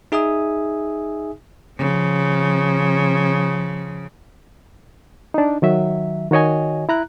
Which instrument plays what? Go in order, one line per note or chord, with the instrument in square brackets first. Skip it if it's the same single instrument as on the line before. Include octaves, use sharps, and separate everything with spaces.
[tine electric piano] D#4 G#4 E5 G#5 D#6
[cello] C#3 F3
[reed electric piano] D4 D#4
D#3 F#3 E5
D#3 F#4 C#5 D#5 G#5
E4 A#5 F#6